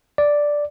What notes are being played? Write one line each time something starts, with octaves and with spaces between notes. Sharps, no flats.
D5